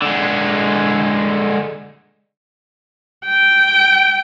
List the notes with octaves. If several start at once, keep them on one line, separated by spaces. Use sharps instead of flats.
D3 G#3
G5